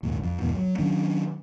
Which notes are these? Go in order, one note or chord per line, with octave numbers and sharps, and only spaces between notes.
A#1 D#2 G#2
F2
A1 E2 G#2 B2
F#3
D#3 F#3 C#4 D4